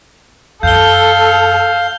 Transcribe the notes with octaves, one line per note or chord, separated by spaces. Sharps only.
F#2 A4 F5 G6 G7